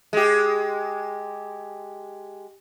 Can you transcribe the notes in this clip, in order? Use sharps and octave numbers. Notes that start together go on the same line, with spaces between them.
G#3 G4